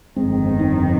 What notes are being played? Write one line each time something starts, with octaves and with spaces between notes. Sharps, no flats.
G1 F2 D#3 G#3 C4
C4 D#4